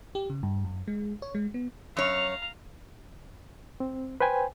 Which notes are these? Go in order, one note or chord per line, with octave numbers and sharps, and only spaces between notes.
G4
C#3
G2
F#2
G#3
C#5
G#3
B3
F#2 C#5 F5 A#5
C4
B4 C5 G5 G#5